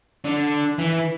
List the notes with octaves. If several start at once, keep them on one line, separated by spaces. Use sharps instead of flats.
D3
E3